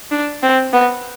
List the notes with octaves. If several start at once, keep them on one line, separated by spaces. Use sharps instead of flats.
D4
C4
B3